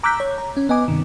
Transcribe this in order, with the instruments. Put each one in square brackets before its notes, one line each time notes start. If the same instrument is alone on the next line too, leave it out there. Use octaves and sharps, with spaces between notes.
[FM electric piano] A#5 D6 E6 F#6 G6 B6
C#5
A#5
C#4
B3 D#5 G#5 D6
G2 C3 D#3